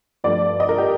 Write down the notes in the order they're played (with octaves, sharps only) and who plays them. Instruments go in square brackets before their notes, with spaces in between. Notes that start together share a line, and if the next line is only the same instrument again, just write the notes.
[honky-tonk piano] G2 F3 A3 D5
D#5
A#4
G4